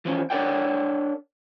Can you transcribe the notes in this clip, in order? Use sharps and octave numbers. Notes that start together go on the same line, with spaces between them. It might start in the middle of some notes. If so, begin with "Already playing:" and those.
E3 F3 C4 C#4
D4 A#4 C#5 D5 F#5 G5